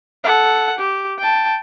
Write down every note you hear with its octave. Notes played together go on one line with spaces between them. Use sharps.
A4 F#5
G4
G5 A5